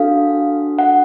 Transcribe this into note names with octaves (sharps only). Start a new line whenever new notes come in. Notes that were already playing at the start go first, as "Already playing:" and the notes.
Already playing: D4 F#4 A4 F5
F#5